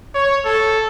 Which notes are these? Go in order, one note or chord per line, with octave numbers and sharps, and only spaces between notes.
C#5
A4